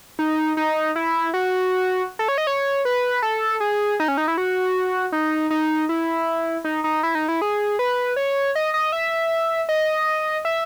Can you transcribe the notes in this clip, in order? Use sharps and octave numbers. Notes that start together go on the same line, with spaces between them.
D#4
D#4
E4
F#4
A4
C#5
D#5
C#5
B4
A4
G#4
D#4
C#4
D#4
E4
F#4
D#4
D#4
E4
D#4
D#4
E4
D#4
E4
G#4
B4
C#5
D#5
D#5
E5
D#5
E5